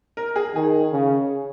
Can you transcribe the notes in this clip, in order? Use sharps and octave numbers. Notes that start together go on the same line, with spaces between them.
A#4
G#4
D#3 G#4
C#3